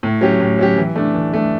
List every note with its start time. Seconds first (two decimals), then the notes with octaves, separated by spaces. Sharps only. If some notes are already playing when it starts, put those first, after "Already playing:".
0.03 A2
0.21 F#3 C#4 G4
0.40 A2
0.59 F#3 C#4 G4
0.78 E3
0.96 A3 D4
1.14 E3
1.33 A3 D4